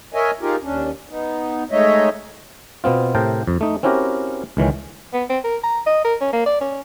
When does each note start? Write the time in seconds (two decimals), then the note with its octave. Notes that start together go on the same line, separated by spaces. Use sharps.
0.14 A#4 C#5 D#5 E5 G#5
0.41 D#4 F4 G4 G#4 A#4
0.63 D#2 C#4 D4
1.10 B3 D#4
1.71 G#3 A3 D#4 C#5 D#5 E5
2.84 B2 B3 C4 F4
3.15 A2 C3 A#4 C5 G5 A5
3.47 F2
3.61 A3 D#4
3.83 C4 C#4 E4 F#4 G4 A#4
4.57 C#2 D#3 E3 C#4
5.13 B3
5.30 C4
5.44 A#4
5.64 A#5
5.86 D#5
6.05 A#4
6.21 C#4
6.33 A#3
6.46 D5
6.61 C#4